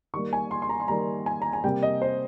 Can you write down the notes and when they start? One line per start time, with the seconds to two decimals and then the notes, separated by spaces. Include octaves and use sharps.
0.14 D#3 G3 A#3 C#6
0.33 G#5
0.51 C6
0.62 C6
0.69 A#5
0.80 C6
0.88 D#3 G3 A#3 A#5
1.26 G#5
1.42 A#5
1.53 G#5
1.64 C3 G3 A#3 G5
1.83 D#5
2.02 C5